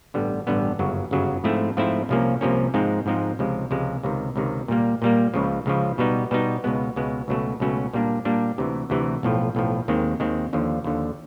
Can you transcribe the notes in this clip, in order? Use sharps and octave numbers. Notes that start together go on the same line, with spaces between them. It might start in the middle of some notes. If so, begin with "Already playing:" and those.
A1 G2 D3 G3 B3
A1 G2 D3 G3 B3
G1 F#2 C#3 F#3
G1 F#2 C#3 F#3
G#2 F3 A3 C4 E4
G#2 F3 A3 C4 E4
C2 C3 F3 A#3 C#4
C2 C3 F3 A#3 C#4
G#2 F3 G#3 C4 D#4
G#2 F3 G#3 C4 D#4
C#2 C3 F3 G#3
C#2 C3 F3 G#3
C#2 C3 D#3
C#2 C3 D#3
A#2 G3 A#3
A#2 G3 A#3
C#2 C#3 F3
C#2 C#3 F3
B2 G3 B3 D#4
B2 G3 B3 D#4
C#2 B2 G#3 B3
C#2 B2 G#3 B3
C#2 B2 F#3 A3 C#4
C#2 B2 F#3 A3 C#4
A#2 G3 A#3 D4
A#2 G3 A#3 D4
D2 C3 E3
D2 C3 E3
B1 A2 F3
B1 A2 F3
D#2 D#3 G#3 C4
D#2 D#3 G#3 C4
D#2 D3 F3
D#2 D3 F3